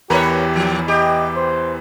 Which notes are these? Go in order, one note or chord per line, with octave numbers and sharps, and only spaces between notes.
E2 E3 G4 A#4 B4 C#5 B5
A#2 F3
G4 D#5
C5